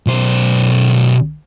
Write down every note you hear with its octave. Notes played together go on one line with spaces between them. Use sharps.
B1 C5